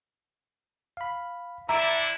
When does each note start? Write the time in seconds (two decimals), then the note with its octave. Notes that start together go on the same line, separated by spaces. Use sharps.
0.97 F5 B5
1.69 D3 E4 E5 A#5 D6